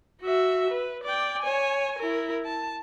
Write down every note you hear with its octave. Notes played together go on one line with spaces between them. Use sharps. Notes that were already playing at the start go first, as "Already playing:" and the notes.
F#4 E5
B4
D5 G5
C#5 G#5
E4 A#4
A5